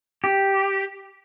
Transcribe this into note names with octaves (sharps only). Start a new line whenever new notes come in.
G4